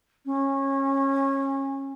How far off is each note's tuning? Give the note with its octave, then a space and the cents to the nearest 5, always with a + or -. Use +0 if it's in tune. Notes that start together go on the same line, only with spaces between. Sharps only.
C#4 -25